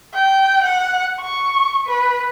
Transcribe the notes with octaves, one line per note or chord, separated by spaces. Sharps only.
G5
F#5
C#6
B4